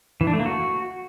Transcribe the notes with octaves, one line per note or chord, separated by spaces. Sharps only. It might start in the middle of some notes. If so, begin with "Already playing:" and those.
E3
D4
A3
A#3
F#4